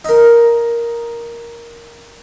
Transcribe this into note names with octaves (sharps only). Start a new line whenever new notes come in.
D#4 A#4